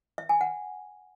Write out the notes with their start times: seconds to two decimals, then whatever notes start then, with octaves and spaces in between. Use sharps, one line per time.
0.18 E5
0.29 G#5
0.41 F#5